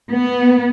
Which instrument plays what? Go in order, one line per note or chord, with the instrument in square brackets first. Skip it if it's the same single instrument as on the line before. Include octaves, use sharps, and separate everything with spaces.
[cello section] B3